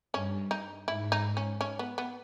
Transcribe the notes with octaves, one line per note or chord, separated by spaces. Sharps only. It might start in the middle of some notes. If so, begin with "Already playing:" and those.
G2 C#4
D#4
G#2 E4
D#4
C#4
C#4
B3
B3